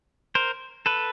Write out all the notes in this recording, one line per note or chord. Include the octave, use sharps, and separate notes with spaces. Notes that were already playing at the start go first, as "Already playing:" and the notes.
A#4 C5
A4 B4